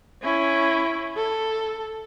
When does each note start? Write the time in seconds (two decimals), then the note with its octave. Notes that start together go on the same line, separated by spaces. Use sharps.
0.22 C#4 E4
1.17 A4